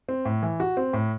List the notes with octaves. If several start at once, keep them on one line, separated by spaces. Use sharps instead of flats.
C4
A2
E3
F#4
C4
A2